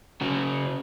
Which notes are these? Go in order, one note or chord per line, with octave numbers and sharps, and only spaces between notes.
C#3 F#4